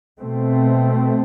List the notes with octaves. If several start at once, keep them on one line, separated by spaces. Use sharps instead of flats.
B2 A3 C4